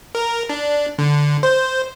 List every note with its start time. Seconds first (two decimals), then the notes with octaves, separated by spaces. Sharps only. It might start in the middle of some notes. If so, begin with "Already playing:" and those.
0.15 A#4
0.49 D4
0.99 D3
1.43 C5